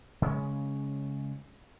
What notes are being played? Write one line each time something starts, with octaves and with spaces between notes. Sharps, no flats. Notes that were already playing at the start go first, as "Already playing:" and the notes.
C#3 G#3 C#4